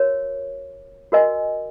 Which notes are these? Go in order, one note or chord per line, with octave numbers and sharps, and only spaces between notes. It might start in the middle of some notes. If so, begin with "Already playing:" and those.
Already playing: F#4 A#4 C#5
F#4 A#4 D#5 G#5